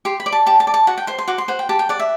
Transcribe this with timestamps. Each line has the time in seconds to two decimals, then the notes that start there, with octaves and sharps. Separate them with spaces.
0.05 G4 C6
0.20 B5
0.26 D5
0.32 A5
0.46 G4 A5
0.60 A5
0.67 D5
0.74 A5
0.87 F#4 F#5
0.98 G5
1.07 C5 C6
1.19 C6
1.28 F#4 D6
1.38 C6
1.48 C5 F#5
1.59 G5
1.69 G4 A5
1.79 G5
1.89 D5 F#5
1.99 E5